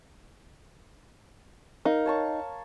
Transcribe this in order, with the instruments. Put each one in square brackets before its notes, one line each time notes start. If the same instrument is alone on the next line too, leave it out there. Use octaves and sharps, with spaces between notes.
[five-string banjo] D#4 [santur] A#4 F5
[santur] C#5 A5 C#6